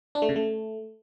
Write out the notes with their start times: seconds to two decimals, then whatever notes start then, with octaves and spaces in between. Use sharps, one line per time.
0.15 D4
0.22 A3
0.29 C#3
0.36 A3